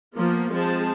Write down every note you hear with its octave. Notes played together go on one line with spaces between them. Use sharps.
F3 A#3 B3 F4
F3 G#3 C4 G#4 C5 A5